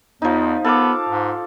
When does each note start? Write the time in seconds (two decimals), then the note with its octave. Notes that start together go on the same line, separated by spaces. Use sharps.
0.22 E2 F3 D#4
0.64 B3 A4 F5 D6
1.09 G#2